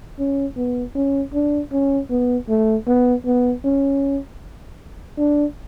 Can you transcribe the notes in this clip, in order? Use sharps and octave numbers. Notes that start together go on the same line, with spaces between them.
C#4
B3
C#4
D4
C#4
B3
A3
B3
B3
C#4
D4